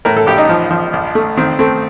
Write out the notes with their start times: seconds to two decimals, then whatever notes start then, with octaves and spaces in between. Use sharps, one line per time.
0.05 A2 A#4
0.17 A4
0.27 A#1 G4
0.38 D#4
0.49 F3
0.71 F3
0.93 A#1
1.15 A3
1.37 D#3 C4
1.59 A3 C4